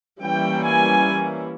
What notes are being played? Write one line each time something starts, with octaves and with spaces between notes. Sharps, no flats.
E3 G3 A#3 C#4 E4 G5
G#5